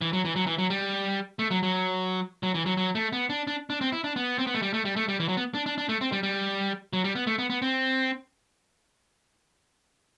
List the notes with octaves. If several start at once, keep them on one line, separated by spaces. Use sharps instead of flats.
E3
F#3
E3
F#3
E3
F#3
G3
A3
F#3
F#3
F#3
E3
F#3
F#3
A3
B3
D4
D4
D4
C4
E4
D4
B3
C4
B3
A3
G3
A3
G3
A3
G3
E3
F#3
B3
D4
D4
D4
A3
C4
G3
G3
F#3
G3
B3
A3
B3
B3
C4